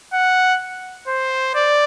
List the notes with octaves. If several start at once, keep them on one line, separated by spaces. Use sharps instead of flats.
F#5
C5
D5